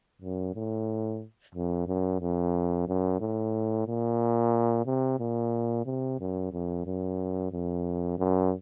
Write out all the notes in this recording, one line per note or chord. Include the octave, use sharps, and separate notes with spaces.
F#2
A2
F2
F#2
F2
F#2
A2
A#2
C3
A#2
C3
F#2
F2
F#2
F2
F#2